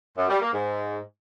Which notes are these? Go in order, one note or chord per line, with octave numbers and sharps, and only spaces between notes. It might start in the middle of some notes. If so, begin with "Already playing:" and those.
F#2
G3
A#3
G#2